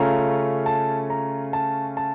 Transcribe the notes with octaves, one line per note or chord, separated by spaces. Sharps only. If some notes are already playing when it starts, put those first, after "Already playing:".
Already playing: C#3 A3 C#4 F4 A#5
A5
A#5
A5
A5